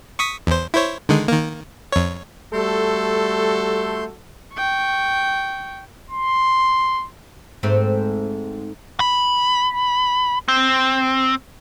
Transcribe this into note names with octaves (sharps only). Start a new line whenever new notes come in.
C#6 D#6 B6
E2 C5
E4 C5 C#5
D3 D#3 G#3
D#3 A#3
F2 C#5
G3 A3 F#4 A4 C6 G6
G5 C#6
C6
G#2 A3 C4
B5
C4